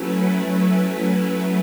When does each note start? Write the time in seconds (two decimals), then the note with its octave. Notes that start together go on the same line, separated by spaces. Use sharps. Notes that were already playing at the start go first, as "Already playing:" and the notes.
Already playing: F#3 A3 C#4 E4 B4